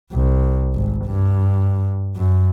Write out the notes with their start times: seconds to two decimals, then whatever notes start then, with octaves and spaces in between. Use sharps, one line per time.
0.13 C2
0.74 G#1
1.06 G2
2.16 F#2